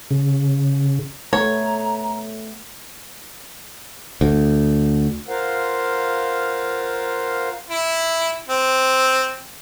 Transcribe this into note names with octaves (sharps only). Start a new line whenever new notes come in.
C#3
A3 B3 C#5 A#5
D2
F4 A#4 C5 F5 F#5
E4
C4